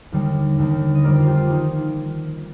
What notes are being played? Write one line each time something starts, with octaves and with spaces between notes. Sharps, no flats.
D#2 D3 G3 A#3
D#2 D3 G3 A#3
D#5
F2 D#3 G3 A#3 A#4 D5
F4
G4
F4
D#3 G3 A#3 D#4